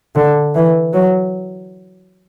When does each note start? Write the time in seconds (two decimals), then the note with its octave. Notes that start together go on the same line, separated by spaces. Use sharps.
0.16 D3
0.55 E3
0.93 F#3